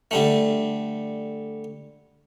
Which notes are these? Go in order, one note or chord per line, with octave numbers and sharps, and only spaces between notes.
D3 G3 A3